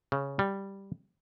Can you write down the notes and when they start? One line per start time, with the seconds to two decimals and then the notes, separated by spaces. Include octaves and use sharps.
0.12 C#3
0.39 G3